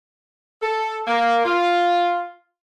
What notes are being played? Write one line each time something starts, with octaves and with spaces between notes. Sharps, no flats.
A4
A#3
F4